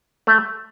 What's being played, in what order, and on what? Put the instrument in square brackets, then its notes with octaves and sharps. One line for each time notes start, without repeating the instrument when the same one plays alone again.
[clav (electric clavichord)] A3